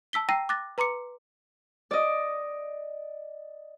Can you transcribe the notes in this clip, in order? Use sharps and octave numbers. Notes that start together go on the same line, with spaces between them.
A5 E6 B6 G7
G5 A#5 E6 A#6 C7 D#7
D6 F#6 A6 A#6
B4 A#5 C6 D6 C#7
D5 D#5